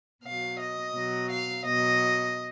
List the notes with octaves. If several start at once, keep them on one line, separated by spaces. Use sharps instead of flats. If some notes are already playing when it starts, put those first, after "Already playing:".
B2 F#3 F5
D#5
B2 F#3
F5
B2 F#3 D#5